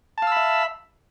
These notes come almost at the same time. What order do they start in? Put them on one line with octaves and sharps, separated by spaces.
A5 F5 E6 B5 E5